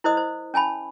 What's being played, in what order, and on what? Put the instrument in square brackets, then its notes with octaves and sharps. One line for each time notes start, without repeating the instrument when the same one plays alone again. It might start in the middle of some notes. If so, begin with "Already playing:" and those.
[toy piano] E4 A#4 C5 D#5 D#6
C5
C#4 G#5 A5 B5